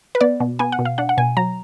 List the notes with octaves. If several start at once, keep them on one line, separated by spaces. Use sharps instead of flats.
B4
B3 D5
B2
B3 G#5
F#5
B2
F5
D4 F#5
F#5
B2 G#5
F#3 A#5